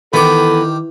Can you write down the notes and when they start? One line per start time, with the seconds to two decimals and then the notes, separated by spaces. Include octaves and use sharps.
0.13 D#3 E3 B3 G4 A4